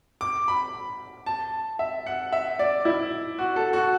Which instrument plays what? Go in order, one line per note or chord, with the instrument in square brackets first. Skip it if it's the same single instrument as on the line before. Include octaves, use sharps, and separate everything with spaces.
[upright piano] D6
B5
A5
E5
F#5
E5
D5
E4
F#4
A4
F#4